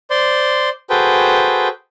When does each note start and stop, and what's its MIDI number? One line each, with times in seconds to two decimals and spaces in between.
0.10 0.69 72
0.10 0.69 74
0.10 0.69 84
0.90 1.68 66
0.90 1.68 68
0.90 1.68 69
0.90 1.68 71
0.90 1.68 72
0.90 1.68 79